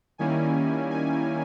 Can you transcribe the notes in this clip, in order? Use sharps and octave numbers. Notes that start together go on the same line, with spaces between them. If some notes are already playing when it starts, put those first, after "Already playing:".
D#3 G3 A#3 C#4 E4 G#5
G#5